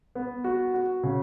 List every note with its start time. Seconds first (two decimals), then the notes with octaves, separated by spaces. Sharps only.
0.15 B3
0.44 F#4
0.74 F#4
1.03 C#3